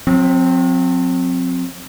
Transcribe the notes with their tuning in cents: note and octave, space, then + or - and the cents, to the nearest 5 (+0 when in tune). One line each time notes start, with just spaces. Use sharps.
F#3 -45 C4 +0